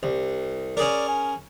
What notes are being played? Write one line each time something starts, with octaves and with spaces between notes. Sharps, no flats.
C2
C#4 G#4 A#4 D5
G#5